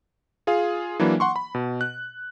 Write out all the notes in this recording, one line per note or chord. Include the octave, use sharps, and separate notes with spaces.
F4 G#4 F5
E3 F#3 A#3 D4 E4
F#5 C6 C#6
B5
B2
F#6